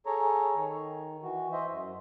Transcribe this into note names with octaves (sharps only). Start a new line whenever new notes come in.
G#4 A4 C#5 A#5
D#3
E3 F#4
C5 D#5 E5
F#2